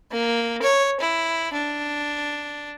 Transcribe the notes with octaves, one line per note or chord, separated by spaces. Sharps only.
A#3
C#5
E4
D4